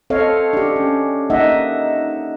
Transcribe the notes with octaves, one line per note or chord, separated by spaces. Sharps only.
C4 A4 C#5 D#5 F5
D4 G4
C#4
A#3 D#4 D#5 E5 F#5